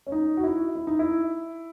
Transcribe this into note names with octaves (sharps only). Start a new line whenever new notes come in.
C#4
D#4
F#4
E4
E4
D#4
E4